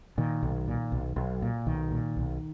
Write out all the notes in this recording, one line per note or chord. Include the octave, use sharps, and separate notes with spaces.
A#2 D#3
B1
A#2
B1
B1
A#2
B1 D#3
A#2
B1